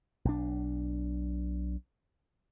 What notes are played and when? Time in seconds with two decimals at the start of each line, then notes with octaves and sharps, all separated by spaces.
0.25 B1 D4